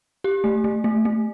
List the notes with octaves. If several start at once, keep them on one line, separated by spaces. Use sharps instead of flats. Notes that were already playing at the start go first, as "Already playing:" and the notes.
G4
A3
A3
A3
A3